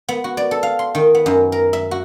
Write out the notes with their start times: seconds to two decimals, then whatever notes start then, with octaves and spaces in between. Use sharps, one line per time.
0.09 B3
0.24 F#4
0.37 D5
0.51 A4
0.63 F5
0.79 C6
0.95 D#3
1.15 B3
1.26 F#2
1.52 A#4
1.73 E5
1.91 F#4